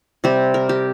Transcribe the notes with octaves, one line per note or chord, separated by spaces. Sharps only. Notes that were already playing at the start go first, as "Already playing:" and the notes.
C3 G3 C4 G4
A#4
G4